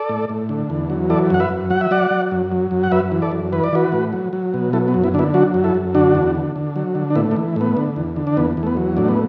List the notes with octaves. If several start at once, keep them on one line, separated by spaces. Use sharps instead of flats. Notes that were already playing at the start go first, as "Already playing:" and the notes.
Already playing: A4 D5
A2
A2
D3
E2
F#3
E3 A4 D5
F#2 F#5
B4 E5
F#2
F#3 F#5
E5
F#3 D5 F#5
F#3
F#2
F#3
F#2
F#5
F#2 B4 E5
E3
A4 D5
F#2
E3 B4
D5
E3 F#4 B4
A2
F#3
F#3
B2
F#3 E4 A4
B3
F#2
B3 E4
D3 B3 D4 E4
F#3 D4 F#4
F#2
E4 A4
F#2
D3 D4 F#4
E2
D3
D3
F#3
D3
D4
A2 B3 E4
A3 D4
E3
A2 B3
D3
E2
D3
D4
E2 B3
E2
A3
B3
F#3
A2 D4
B3